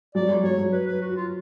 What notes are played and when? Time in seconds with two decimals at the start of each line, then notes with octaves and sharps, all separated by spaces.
0.15 F#3 D5
0.29 F#3
0.43 F#3 C#5
0.58 F#3
0.72 B4
0.87 B4
1.02 F#4
1.16 F4